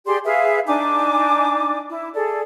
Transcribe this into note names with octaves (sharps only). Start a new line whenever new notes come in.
G4 G#4 D5 C6
G#4 B4 E5 F5
D4 D#4 G#5 D6
E4
G#4 A4 D5